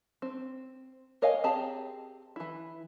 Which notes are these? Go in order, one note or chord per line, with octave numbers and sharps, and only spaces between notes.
C4
A#4 C#5 D#5 F5 G#5
C4 G4 G#4 A5 A#5
E3 E4